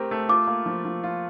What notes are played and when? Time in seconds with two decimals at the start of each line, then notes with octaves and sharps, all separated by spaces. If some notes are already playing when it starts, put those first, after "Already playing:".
Already playing: A3 C4 G4 A#4
0.11 A3
0.29 F4 D6
0.47 A#3
0.66 F3
0.85 F3
1.04 F4